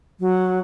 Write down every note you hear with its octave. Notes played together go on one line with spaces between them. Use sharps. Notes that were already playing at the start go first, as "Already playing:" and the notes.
F#3